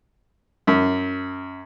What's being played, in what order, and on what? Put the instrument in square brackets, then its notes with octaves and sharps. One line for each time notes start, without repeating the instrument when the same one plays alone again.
[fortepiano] F#2